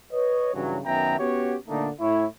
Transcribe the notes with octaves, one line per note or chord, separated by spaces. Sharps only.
B4 C#5 D#5
G2 C#3 E3 F#3
F#2 D#3 B3 E5 G5 A#5
B3 C#4 F#4 G4 C#5
A#2 D3 A3 A#3 D4 D#4
A2 E4 C#5